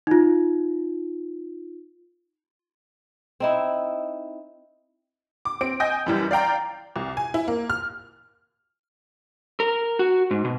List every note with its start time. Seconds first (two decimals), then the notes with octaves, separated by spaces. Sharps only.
0.07 D#4 F4
3.40 C4 D#4 E4
5.45 D6
5.61 C4 D7
5.80 D#5 G5 G#5 G6 A#6
6.06 F#2 E3 G3
6.31 D5 F5 G5 A#5
6.96 C2
7.17 G#5
7.34 E4
7.48 A#3
7.70 F6
9.60 A#4
9.99 F#4
10.31 G#2
10.45 B2